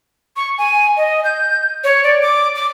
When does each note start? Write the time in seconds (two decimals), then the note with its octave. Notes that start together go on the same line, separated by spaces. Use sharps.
0.36 C#6
0.58 G#5
0.97 D#5
1.24 G6
1.84 C#5
2.04 D5
2.22 D6
2.56 D6